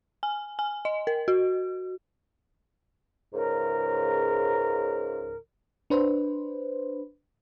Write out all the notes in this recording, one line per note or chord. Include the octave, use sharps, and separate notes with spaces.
G#5
G#5
D#5
A#4
F#4
C#2 G#2 C#3 A#4
D4 B4 C5